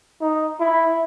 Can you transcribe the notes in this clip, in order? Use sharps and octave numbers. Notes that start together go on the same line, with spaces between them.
D#4
E4